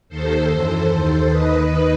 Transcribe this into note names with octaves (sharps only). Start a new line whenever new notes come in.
D#2 D#3 A4 C5
F#2 E3
D#2 D#3
D#2 D#3 B4 D#5